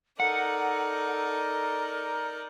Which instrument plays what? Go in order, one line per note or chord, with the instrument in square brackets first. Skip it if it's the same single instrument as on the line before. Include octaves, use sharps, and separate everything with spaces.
[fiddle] D#4 D5 [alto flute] A4 [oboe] A#4 [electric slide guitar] F#5